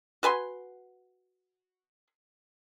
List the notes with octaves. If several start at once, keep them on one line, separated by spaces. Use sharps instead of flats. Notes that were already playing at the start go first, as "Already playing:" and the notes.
F#4 B4 G#5 C6